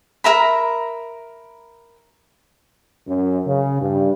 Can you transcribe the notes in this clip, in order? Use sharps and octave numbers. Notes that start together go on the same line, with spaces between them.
A#4 E5 A#5 B5
F#2
C#3
G2